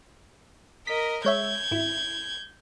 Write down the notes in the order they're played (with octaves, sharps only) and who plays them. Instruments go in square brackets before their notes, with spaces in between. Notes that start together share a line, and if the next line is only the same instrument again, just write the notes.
[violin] A#4 D#5 [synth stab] B6
[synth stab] G#3 C#5 E5 [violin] G6 G#6
[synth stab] G#1 E4